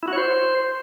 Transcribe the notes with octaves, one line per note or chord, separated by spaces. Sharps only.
E4
F#4
C#5
C5